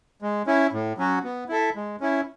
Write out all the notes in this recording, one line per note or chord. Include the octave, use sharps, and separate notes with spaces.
G#3
C#4 E4
A2
F#3 C#4 F#4
B3
E4 A4 E5
G#3
C#4 E4